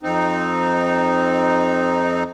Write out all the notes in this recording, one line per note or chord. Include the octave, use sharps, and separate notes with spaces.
F2 C4 D#4